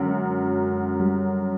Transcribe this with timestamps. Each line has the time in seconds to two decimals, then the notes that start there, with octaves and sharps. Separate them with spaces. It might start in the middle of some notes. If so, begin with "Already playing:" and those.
Already playing: F#2 D3 F#3 G#3 C#4
1.00 G3